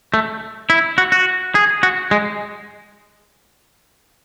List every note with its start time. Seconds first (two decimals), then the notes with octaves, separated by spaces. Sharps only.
0.14 A3
0.70 E4
0.98 F#4
1.12 F#4
1.55 G#4
1.83 F#4
2.11 G#3